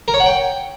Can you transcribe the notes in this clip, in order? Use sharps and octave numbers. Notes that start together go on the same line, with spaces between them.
A#4
C#5
F#5
G5